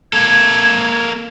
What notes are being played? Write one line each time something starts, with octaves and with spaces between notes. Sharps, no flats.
A#3 A4 G#6